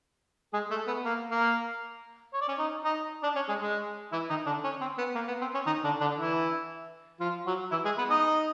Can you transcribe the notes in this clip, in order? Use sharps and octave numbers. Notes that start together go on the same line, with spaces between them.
G#3 G#4
A3 A4
B3 B4
A#3 A#4
A#3 A#4
C#5
D5
C#4 C#5
D#4 D#5
D#4 D#5
D4 D5
C#4 C#5
G#3 G#4
G#3 G#4
E3 E4
D#3 D#4
D3 D4
C#4
C4
B3
A#3
B3
C4
C#4
D#3 D#4
D3 D4
D3 D4
E3 E4
F3 F4
F#3 F#4
E3 E4
G#3 G#4
B3 B4
D#4 D#5